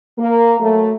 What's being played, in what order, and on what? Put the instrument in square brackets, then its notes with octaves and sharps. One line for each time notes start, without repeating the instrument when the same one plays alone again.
[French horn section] A#3
F#3 A3